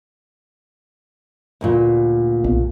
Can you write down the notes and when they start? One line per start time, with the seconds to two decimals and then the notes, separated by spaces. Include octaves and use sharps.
1.61 D2 G2 A#2
2.44 B1